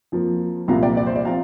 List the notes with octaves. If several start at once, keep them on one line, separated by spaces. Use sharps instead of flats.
F2 F3 A#3
C2 A#2 F3 A#3 F5 A#5
D5 G5
D5
C5
D5
F3 C4 F5 A#5